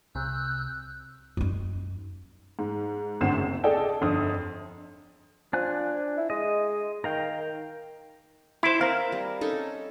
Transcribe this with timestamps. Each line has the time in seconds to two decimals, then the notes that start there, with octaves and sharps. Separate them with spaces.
0.15 C2 C3 E6 F#6 G6
1.37 F#2 D#4
2.59 G#2
3.21 G#1 D2 C4 E6 C7 E7
3.35 F#1
3.63 G#4 A4 D5 D#5 G5 A5
4.01 G1 F2 D3 D#6
5.53 F3 D4 G#5 F#6
6.17 E4
6.30 G#3 D#5
7.04 D#3 A#4 F5 G5
8.63 E4 C5 F5 D6
8.81 C4 A#4 F5
9.12 G3
9.41 C#4 D#4 A4